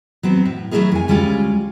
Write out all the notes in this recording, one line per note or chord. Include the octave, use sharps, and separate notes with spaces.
F#3 B3 C4
A2
F#3 A3 D#4 E4 G#4 A#4
F2 G#5
D2 G3 G#3 C#4 F4 G#5